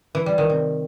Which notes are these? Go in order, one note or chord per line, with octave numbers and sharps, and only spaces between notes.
E3
G3
D#3
C3